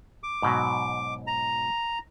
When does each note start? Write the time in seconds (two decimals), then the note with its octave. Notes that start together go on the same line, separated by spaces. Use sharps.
0.23 D6
0.42 G#2 B2 F#3
1.27 A#5